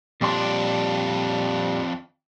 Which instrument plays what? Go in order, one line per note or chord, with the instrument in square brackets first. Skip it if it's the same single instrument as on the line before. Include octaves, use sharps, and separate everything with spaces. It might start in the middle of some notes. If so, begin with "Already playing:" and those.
[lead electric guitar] F2 D4 [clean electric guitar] A#2 G3 C6